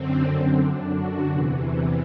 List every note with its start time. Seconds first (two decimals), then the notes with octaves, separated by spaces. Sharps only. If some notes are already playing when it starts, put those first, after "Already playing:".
Already playing: F#2 D3 C4
0.25 C4
0.59 F#2 D3 D4
0.93 F#4
1.28 E2 C3 E3